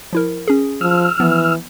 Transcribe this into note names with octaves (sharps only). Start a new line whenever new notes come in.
F3 E4 A#4
C#4 G#4
F3 E6 F6
E3 F3 B3